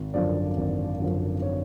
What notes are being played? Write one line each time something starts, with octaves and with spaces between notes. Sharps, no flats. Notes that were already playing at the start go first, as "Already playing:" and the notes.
Already playing: G#1
F#2 D3 F3 D5
G#1
F#2 D3 F3
C#5